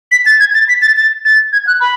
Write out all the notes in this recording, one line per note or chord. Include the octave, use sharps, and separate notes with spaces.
B6
A6
G#6
A6
B6
A6
A6
A6
G#6
F#6
B5